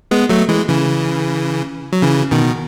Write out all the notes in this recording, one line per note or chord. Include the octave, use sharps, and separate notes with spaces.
G#3 B3
F#3 A3
E3 G#3
C#3 E3
F#3
C#3 E3
B2 D#3